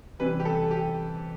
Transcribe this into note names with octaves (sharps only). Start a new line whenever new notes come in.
C3 E3 G3 B4
G4
A4
G4